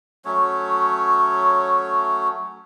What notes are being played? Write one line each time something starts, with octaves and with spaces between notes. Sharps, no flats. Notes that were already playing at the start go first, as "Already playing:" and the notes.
F#3 A3 C#4 C#5